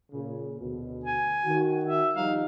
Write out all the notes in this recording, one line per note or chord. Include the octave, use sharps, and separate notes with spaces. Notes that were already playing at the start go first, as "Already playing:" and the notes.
A#2 C#3
D2 B2
G#5
D#3 F#4
E5
F3 G3 D#4 F5